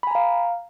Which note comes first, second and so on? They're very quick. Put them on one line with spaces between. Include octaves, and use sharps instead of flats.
B5 G#5 A#5 F5